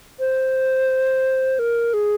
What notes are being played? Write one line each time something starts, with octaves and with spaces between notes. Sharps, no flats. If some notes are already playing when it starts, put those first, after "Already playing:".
C5
A#4
G#4